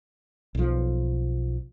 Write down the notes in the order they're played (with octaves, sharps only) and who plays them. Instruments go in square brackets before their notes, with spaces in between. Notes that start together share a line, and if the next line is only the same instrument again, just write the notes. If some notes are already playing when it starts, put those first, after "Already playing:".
[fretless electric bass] B1 F3